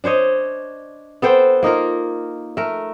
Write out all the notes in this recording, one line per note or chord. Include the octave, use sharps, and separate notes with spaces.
D4 C5 C#5 D#5
B3 A4 C5 G5
A#3 D#4 F4 A#4
A3 A#4